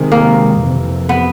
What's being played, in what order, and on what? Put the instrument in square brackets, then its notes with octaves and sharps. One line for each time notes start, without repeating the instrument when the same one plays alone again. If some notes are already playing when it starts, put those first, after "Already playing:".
Already playing: [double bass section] C3 D#3 G#3
[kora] A#3
[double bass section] F2 C3 E3
[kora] B3